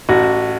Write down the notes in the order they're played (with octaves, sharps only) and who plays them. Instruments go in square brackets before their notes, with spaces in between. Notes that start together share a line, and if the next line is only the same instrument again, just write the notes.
[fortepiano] A1 F#4